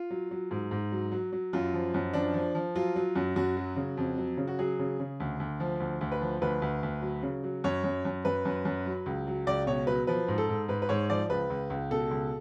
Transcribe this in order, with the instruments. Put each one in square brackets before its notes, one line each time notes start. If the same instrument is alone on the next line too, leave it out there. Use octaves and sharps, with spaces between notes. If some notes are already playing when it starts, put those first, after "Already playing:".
Already playing: [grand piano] F4
F#3
F#3
G#2
G#2
F#3
F#3
F#3
F#2 F4
F3
F#2
F3 D4
F3
F3
F#3 F4
F#3
F#2
F#2 F#4
F#3
C#3
F2
F#3
C#3
F#4
F#3 G#4
C#3
C#3
D2
D2
F3
D2
D2
B4
F3
D2 B4
D2
D2
F#3
C#3
F#3
F#2 C#5
F#2
F#2
F#2 B4
F#2
F#2
F#3
C#2
F#3
C#2 D5
B2 C#5
F#3 B4
F3 B4
G#2
A4
G#2
G#2 B4
B4
G#2 C#5
F3 D5
C#2 B4
C#2
C#2
B2 A4
C#2